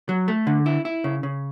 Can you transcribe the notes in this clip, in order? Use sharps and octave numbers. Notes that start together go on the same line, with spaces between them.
F#3
A3
D3
E4
E4
C#3
C#3